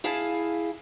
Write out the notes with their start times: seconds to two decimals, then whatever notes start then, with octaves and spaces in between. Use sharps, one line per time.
0.04 E4 G#4 F5 G#5 A5